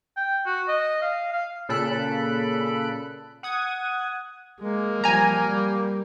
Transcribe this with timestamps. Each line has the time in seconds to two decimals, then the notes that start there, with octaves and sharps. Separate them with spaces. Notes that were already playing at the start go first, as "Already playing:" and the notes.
0.17 G5
0.46 F#4
0.68 D#5
1.02 F5
1.33 F5
1.69 A#2 C#3 A4 B5 F#6 D7
3.43 F#5 D#6 G#6
4.60 G#3 A#3
5.04 F3 G3 G#5 A#5
5.44 G3